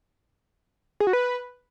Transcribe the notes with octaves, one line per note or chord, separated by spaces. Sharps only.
G#4
F#4
B4